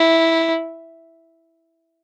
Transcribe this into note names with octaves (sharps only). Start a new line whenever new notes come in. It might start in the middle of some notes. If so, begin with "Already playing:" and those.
Already playing: E4